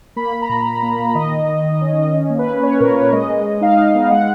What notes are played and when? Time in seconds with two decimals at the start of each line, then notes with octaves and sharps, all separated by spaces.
0.16 A#3 B5
0.33 A#3
0.42 A#5
0.49 A#2
0.66 A#2
0.83 A#3
0.99 A#2
1.15 D#3 D#5
1.31 D#3
1.49 D#3
1.64 D#3
1.81 C#4
1.98 D#3
2.14 C#4
2.30 A#3
2.39 B4
2.47 C#4
2.63 C#4 C#5
2.79 A#2 A#4
2.96 A#3 C#5
3.12 G#3 D#5
3.29 G#3
3.46 G#3
3.61 D#4 F5
3.78 D#4
3.95 B3
4.11 G#3 F#5